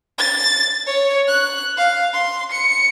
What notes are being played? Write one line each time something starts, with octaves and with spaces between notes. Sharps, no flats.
A6
C#5
F#6
F5
C6
C#7